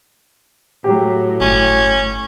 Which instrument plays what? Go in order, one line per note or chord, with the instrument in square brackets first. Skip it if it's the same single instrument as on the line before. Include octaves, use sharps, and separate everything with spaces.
[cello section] A2 [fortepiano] F#3 G4
[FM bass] G1 [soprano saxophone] C#4